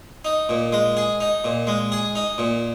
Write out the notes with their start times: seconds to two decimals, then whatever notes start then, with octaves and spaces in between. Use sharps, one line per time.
0.25 D#4
0.49 A#2
0.73 G#3
0.97 G#4
1.21 D#4
1.44 A#2
1.67 G#3
1.92 G#4
2.15 D#4
2.38 A#2